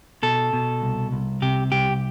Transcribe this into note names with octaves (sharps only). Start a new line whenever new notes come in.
B2 A4
B2
C2
C2
C3 G4
C2 G4